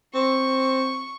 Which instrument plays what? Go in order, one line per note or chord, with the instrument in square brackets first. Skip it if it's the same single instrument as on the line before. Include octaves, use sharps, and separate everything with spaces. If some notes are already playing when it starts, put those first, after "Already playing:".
[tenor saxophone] C4 [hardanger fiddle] C#6